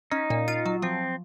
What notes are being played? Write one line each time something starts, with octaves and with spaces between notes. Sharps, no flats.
C#4 D#4
A#2
F4
F#3
F3 C4